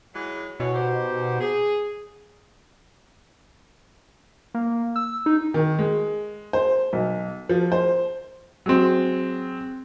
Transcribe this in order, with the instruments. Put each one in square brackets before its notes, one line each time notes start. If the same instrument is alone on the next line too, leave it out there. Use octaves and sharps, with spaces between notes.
[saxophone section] E3 F#3 G#3
[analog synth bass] B2 [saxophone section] E3 C#5
[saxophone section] D#4 G4 C5
G#4
[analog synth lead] A#3
E6
D#4
[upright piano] D#3
G#3
C5
B1
F3
C5
F#3 G#3 C4